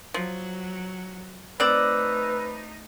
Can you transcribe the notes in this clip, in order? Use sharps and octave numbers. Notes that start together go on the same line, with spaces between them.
F3 F#3
A3 C4 D#4 B4 D5 E6 F#6